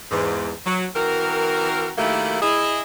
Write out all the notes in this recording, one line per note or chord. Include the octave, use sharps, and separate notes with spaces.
E2 G#2
F#3
E3 C4 F#4 A#4
D#3 F#3 A3 A#3 E4 G4
E4 G#4 D#5